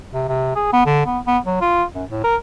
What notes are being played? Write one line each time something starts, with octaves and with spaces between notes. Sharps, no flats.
C3
C3
G#4
B3
D3
B3
B3
F#3
F4
F#2
A2
A#4